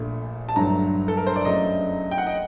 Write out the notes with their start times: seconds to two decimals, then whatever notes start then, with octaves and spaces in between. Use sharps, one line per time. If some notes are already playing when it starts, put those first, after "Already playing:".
Already playing: A#1 A#2 A3
0.49 A5
0.56 G1 G2 F#3 A3 A#5
1.08 A4
1.17 A#4
1.27 C5
1.36 D5
1.45 F#1 F#2 F#3 A3 D#5
2.11 G5
2.18 F#5
2.27 D#5